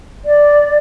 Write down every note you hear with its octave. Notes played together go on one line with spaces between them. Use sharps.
D5